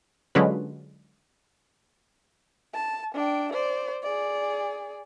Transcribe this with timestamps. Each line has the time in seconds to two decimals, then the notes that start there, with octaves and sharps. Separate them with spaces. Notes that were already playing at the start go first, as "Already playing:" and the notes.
0.35 D3 F#3 G#3 C#4 F4 B4
2.74 A5
3.14 D4 G5
3.52 C5 D5
4.03 G#4 D5